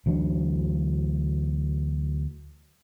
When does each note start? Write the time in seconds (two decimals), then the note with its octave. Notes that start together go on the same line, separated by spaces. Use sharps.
0.06 D2 E3 F#3 D4